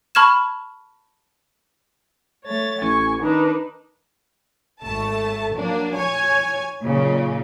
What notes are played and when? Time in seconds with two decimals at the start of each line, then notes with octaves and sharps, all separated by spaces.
0.15 A5 B5 C#6 F6 G#6 E7
2.45 A3 C#5 A6
2.82 A1 G#5 C#6
3.22 D#3 D4 D#4 B4
4.83 G#1 A3 A5
5.54 F#3 A#3 D4
5.95 C#5 G#5 G#6
6.83 A#2 C#3 F#3 D#4